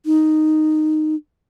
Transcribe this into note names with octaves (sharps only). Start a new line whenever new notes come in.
D#4